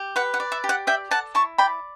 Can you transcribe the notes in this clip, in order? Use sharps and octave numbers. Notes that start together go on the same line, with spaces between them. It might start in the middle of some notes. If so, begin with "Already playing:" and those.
Already playing: G4
B4 F#5
F#5
D5
E5
G4
F#5
D5 E5 G5
A4 F#5 A5
E4 A5 C#6
D5 G5 B5